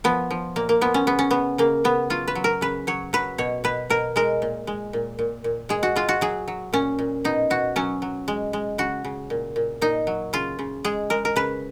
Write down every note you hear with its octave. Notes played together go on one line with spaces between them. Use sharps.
F3 B3
F3
A#2 A#3
A#3
F3 B3
C#4
C#3 B3
C#4
C#3 B3
C#3 A#3
C#3 B3
F#3 F4
B4
F#3
A#4
C#3 B4
F#3 C#5
F#3 B4
B2 C#5
B2 B4
B2 A#4
G#3 A#4
A#2
G#3
A#2
A#2
A#2
G#3 G#4
F#4
G#3 F4
F#4
F#3 G#4
F#3
A#2 C#4
A#2
B2 D#4
B2 F#4
F#3 C#4
F#3
G#3
G#3
C#3 F#4
C#3
A#2
A#2
A#2 D#4
F#3
C#3 F4
C#3
G#3 G#4
G#3 A#4
A#4
C#3 B4